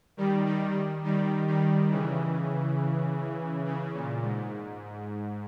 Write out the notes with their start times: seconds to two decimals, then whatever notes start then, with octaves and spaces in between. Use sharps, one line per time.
0.17 D#3 G3
0.46 D#3 G3
1.04 D#3 G3
1.47 D#3 G3
1.91 C#3 E3
3.65 C#3
3.94 A#2
4.22 G#2